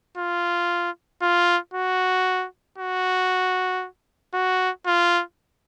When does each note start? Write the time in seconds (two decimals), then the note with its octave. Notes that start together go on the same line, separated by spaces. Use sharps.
0.17 F4
1.22 F4
1.73 F#4
2.78 F#4
4.34 F#4
4.86 F4